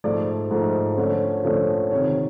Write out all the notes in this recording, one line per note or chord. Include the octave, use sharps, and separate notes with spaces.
G#2 F3 A3 D5
G#2 F3 A3
D3 F3 A3 C#4
D3 F3 A3 C#4
C3 D#3 G#3 C4 C#5